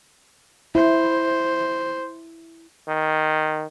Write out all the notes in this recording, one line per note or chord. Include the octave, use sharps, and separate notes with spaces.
E4 C5
D#3